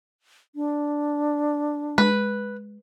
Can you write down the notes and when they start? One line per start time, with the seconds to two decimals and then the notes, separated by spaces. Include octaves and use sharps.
0.55 D4
1.98 G#3 B4